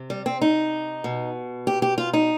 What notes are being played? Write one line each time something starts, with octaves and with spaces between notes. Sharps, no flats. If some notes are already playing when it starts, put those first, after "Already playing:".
Already playing: C3
G3
C4
D#4
B2
G4
G4
F4
D#4